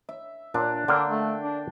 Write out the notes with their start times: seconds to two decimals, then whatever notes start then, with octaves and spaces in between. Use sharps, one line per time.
0.09 E5
0.54 A#2 D4
0.88 D3 A#3 D4 F5 G5
1.09 A3
1.41 D4